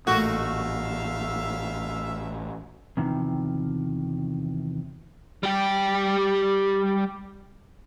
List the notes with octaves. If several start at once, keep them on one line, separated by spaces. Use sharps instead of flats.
A1 A#2 A3 A#3 F#4 E5 F5 E6
E2 C3 D#3 F3
G3 G4